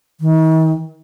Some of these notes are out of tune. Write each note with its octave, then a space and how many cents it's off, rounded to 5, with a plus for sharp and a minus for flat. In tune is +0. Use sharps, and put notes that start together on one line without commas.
D#3 +45